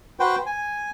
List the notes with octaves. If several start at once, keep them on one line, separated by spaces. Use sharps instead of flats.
F#4 B4 C5 G5
G#5